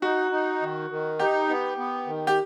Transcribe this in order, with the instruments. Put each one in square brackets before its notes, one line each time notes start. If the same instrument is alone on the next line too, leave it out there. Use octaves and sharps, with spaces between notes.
[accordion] D#4 [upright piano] F#4
[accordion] D#4
D#3
D#3
[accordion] D#4 [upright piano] G4
[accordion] B3
B3
D#3
[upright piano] G4